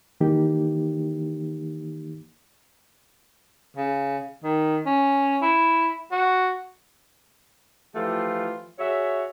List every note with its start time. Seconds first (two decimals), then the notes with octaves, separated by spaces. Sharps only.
0.21 D#3 E3 A#3 D#4 G4
3.76 C#3
4.44 D#3
4.86 C#4
5.42 E4
6.12 F#4
7.94 E3 F3 A3 F4 G4
8.79 F#4 G#4 C#5 E5